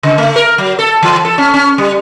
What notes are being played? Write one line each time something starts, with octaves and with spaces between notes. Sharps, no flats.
C#3
A3
A#4
F#3
A4
E3
A4
C#4
C#4
G3